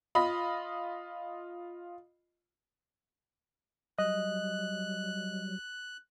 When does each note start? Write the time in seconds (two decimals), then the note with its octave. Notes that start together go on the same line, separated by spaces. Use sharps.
0.15 F4 D#5 B5
3.99 F#3 G3 D#5 F#6